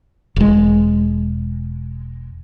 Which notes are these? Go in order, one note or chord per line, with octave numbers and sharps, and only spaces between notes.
E1 G#3